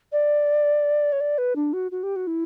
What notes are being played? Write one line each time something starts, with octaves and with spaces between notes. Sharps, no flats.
D5
C#5
D5
B4
D4
F#4
F#4
G4
F#4
E4